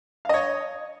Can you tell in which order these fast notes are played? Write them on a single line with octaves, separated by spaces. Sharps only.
F5 D#5 C#5